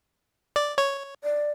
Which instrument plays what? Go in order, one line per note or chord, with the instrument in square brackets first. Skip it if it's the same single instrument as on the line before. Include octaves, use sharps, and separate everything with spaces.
[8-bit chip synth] D5
C#5
[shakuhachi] D5